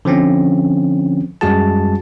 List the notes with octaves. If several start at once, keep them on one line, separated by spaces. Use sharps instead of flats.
D3 F3 C4 C#4
F#2 G3 G#3 F#4 G#4 A5